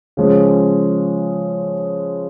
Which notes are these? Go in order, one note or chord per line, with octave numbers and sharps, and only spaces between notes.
C#3 F3 G#3 C#4